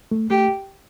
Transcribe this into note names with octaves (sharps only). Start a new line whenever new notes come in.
A3
A3 G4